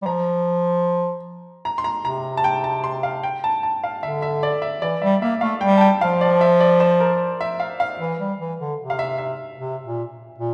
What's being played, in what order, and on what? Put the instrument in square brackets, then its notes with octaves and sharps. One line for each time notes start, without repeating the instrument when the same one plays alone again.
[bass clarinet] G3
[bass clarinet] F3 [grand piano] A#5
[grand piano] A#5
C6
A#5
[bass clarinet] C3 [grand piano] A#5
[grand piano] A5
G5
A5
C6
F5
G5
A5
A5
F5
[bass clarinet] D3 [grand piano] E5
[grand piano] E5
D5
E5
[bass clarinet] E3 [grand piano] D5
[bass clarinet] G3 [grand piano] E5
[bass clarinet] A#3 [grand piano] E5
[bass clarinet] A3 [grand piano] F5
[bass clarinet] G3 [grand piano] G5
[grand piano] A5
G5
[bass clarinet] F3 [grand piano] F5
[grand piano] D5
E5
D5
C5
A#4
E5
F5
F5
[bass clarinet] E3
G3
E3
D3
C3
[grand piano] F5
E5
E5
[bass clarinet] C3
A#2
A#2